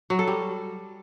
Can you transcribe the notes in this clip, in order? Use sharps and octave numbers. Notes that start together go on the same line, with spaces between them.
F#3
A4
G3